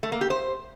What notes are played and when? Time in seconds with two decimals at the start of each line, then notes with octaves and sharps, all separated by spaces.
0.03 A3
0.12 A#3
0.21 G4
0.30 C5